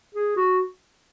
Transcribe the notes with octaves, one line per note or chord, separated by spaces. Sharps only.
G#4
F#4